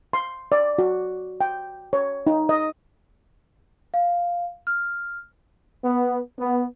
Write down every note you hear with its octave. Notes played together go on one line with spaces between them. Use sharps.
C6
D5
F#4
G5
C#5
D#4
D#5
F5
F6
B3
B3